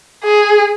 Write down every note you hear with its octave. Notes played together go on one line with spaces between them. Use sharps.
G#4